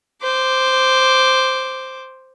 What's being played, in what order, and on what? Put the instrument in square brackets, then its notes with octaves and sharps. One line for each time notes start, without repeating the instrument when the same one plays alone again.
[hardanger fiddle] C5 D6